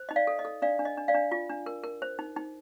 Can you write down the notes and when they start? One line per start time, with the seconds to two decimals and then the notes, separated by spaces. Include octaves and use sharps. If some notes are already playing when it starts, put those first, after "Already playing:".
Already playing: C5
0.09 D#4 D#5
0.16 D5 F5
0.27 A4
0.39 D#5
0.45 A4
0.62 D4 D5 F5
0.79 D4
0.85 D#5
0.97 D4
1.08 D5 F5
1.15 D4
1.32 F4
1.50 D4
1.66 A#4
1.84 A#4
2.02 C5
2.19 D#4
2.37 D#4